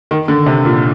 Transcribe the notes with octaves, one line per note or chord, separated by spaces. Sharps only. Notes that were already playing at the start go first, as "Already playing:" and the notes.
D#3
D3
C3
A#2